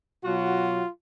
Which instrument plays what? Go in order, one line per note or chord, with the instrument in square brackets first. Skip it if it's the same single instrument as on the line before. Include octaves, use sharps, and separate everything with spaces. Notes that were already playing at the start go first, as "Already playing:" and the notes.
[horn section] B2 F#3 F#4 [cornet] F4